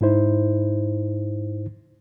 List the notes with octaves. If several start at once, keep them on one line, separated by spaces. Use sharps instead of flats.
G#2 D#4 E4 C5